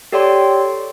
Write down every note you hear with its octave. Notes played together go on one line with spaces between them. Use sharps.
G4 A4 C#5 D5 G5 C6